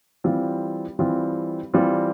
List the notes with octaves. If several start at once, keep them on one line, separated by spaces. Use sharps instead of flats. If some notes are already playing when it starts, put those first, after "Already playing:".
E3 G3 C4 F4
E3 G3 C4 F4
E3 G3 C4 F4